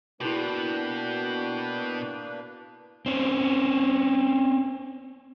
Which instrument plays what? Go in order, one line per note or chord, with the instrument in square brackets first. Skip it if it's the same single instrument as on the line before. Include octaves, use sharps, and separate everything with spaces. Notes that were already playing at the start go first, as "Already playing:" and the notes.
[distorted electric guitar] B2 [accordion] A#3 D4 B4 [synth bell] E4 F#4 [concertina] G5
[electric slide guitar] C4 C#4